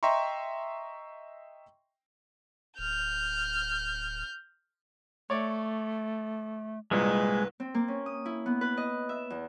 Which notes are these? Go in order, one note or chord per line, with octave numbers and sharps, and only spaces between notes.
D#5 E5 G5 A#5 C6 C#6
D1 F6 G6
A3 C#5 D5 D6
C2 G2 A#2 G#3 B4
C4
A#3
C#4
D#6
E4
B3
B4
D#5
E5
E2